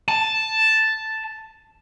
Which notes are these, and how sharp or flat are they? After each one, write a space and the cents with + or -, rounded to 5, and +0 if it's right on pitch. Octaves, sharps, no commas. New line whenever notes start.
A5 +0